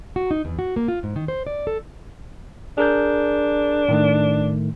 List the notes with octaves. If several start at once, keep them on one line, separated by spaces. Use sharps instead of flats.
F#4
D#4
E2
F#4
A#3
F4
G#2
D#3
C5
D5
A4
D4 G#4 A#4 G6
A2 D#3 A3